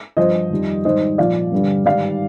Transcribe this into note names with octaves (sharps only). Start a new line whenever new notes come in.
G2 F3 C5 D#5
F2 D#3 G3
G#2 D#3 G3 C5 D#5
A#2 F3 D5 F5
G2 D3 G3
G#2 D#3 G3 D5 F5